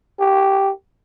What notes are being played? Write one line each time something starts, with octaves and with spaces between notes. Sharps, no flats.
G4